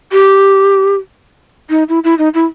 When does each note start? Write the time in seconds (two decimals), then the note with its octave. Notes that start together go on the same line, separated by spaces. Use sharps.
0.12 G4
1.70 D#4
1.89 E4
2.04 E4
2.18 D#4
2.34 E4